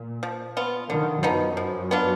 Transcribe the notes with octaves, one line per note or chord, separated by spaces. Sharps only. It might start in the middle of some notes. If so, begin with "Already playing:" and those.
Already playing: A#2
F3
B3 F4
D3 D#3
F#2 F3 B3 D#4
F3
B3 D4 F4